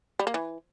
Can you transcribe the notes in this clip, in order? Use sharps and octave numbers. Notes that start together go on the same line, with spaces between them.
G3
A#3
E3